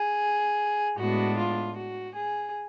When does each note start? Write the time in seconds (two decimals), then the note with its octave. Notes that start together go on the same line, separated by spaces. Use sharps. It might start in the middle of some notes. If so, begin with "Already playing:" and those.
Already playing: G#4
0.98 A2 G#3 B3 D4 F#4
1.37 F4
1.76 F#4
2.15 G#4